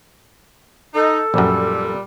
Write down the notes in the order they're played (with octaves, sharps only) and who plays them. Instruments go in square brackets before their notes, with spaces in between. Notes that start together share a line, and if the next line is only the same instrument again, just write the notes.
[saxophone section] D#4 [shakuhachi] A4
[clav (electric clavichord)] A#1 F#2 [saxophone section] A#2 G3